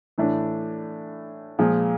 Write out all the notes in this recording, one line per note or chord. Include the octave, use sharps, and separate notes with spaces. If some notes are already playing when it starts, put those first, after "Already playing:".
A2 E3 A3 D4
A#2 F3 G#3